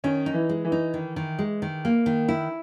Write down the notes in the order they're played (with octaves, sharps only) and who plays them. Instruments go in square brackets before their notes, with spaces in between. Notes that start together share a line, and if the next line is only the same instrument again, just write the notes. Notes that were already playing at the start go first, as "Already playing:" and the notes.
[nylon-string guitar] D#3 [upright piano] C#4
[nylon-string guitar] D#4
[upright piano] E3
[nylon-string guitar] G#3
[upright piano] E3
[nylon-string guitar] D#4
D#3
D#3
G#3
D#3
A#3
D#3
E4